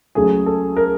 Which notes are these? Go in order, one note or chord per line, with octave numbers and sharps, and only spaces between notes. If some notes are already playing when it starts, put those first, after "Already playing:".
C#2 C#3 F#3 A3 G#4
A4
A#4